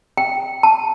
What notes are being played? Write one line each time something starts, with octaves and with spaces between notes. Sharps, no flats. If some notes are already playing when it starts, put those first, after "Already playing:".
G5
A5